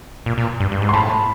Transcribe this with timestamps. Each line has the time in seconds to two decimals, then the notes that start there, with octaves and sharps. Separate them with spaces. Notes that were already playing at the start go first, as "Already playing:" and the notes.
0.26 A#2
0.38 A#2
0.60 G2
0.72 G2
0.82 G#2
0.89 C6
0.93 A2 A5 B5